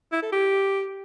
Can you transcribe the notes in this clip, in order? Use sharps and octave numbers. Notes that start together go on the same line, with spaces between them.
E4
A4
G4